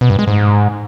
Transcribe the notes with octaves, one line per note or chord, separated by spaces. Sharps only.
B2
G2
G#3
G#2